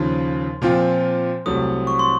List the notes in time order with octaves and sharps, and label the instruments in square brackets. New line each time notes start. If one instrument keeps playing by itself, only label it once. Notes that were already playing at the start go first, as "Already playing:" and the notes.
Already playing: [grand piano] D#2 C#3 F3 [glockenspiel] C6
[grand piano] A#2 F3 C4 F4
[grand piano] C2 C3 F#3 A3 [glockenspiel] D#6
[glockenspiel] C#6
C6